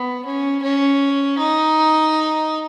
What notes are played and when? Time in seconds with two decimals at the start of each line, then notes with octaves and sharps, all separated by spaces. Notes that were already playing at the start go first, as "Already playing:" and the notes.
Already playing: B3
0.25 C#4
0.62 C#4
1.38 D#4